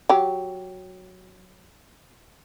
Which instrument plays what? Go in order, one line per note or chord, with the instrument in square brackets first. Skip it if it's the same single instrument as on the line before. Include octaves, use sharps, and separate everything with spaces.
[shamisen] F#3 G4